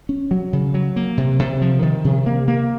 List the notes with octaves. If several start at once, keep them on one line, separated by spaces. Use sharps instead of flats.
C#4
F#3
C#3
F#3
A#3
C3
C3
F3
D#3
C3
A#3
A#3